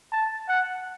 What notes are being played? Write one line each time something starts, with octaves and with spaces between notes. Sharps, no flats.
A5
F#5